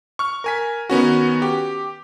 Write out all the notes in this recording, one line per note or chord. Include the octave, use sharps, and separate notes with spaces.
C#6 F6
A#4 G#5 B6
D#3 B3 C#4 F#4
G4